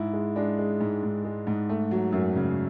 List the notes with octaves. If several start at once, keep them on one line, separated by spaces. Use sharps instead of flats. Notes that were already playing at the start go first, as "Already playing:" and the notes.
Already playing: G#2 E4
G#3
G#3 D4
G#3
G#2
G#2
G#3
G#2
A3
F#3
F#2
C#3